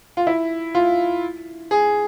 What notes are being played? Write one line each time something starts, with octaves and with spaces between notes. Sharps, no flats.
F4
E4
F4
G#4